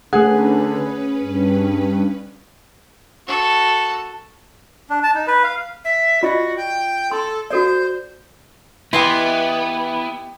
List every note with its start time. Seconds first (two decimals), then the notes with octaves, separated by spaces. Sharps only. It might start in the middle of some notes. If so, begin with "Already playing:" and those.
0.13 D3 A3 C#4 G#4 B4 F#5
1.19 G2
3.28 F#4 A4
4.90 D4
5.03 A5
5.15 D#4
5.27 B4
5.44 F5
5.85 E5
6.23 F4 F#4 D5 D#5
6.57 G5
7.11 A4 C6
7.50 F#4 A4 C5 D5
8.93 E3 B3 E4 G4 D#5 C6